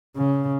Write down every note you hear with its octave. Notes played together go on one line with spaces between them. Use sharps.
C#3